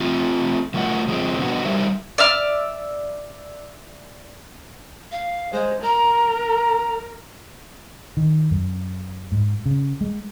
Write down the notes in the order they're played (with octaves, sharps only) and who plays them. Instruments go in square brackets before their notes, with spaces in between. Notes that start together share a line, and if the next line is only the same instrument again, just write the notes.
[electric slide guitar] A3 C4 F4
D3 F#3 A3 F4 A#4 F#5
F3 G#3 C4
D3 B3 F#4
G3 D#4 A#4 C5 E5
[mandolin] D5 E5 F6
[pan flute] F5
[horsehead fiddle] G#3 [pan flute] C5
[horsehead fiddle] A#4 [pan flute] A#5
[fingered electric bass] D#3
F#2
G#2
C#3
G#3